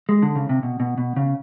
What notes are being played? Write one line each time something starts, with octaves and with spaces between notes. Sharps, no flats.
G#3
D3
C#3
C3
B2
B2
B2
C#3